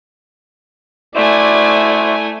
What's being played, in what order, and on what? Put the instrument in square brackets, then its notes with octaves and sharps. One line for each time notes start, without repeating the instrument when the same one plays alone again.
[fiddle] A3 G#5 [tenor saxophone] E4 [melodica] F#4 C5 [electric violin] D5